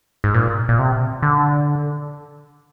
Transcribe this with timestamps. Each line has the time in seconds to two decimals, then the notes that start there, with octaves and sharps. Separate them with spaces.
0.24 G#2
0.34 A#2
0.69 A#2
0.79 C3
1.22 D3